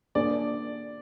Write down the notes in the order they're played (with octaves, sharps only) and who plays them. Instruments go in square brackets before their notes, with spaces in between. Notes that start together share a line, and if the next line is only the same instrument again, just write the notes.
[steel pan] A#3 D4 G#4 [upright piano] D5